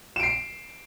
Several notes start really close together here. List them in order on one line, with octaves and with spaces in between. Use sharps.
E7 D7 C7